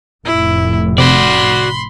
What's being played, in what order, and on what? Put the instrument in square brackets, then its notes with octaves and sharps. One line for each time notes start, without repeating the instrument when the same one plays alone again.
[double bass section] F1 A2 [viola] E4
[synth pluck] C3 [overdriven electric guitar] F#4 D5 [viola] B5 C6